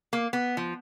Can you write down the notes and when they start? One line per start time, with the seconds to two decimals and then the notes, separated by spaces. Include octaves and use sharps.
0.13 A#3
0.33 B3
0.57 F3